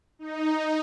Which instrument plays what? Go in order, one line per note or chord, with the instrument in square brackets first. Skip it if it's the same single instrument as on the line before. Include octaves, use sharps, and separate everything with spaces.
[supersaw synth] D#4